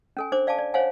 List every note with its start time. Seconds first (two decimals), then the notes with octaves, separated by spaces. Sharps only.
0.17 C#4 A4 G#5
0.32 D4 C5 D6
0.47 D5 F5 G#5 A5 D6
0.58 D5
0.74 C5 C#5 F5 F#5 G#5